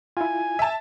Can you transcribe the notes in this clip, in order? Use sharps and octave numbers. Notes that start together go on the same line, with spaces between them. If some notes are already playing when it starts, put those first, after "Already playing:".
E4 F4 G#5
E5 A5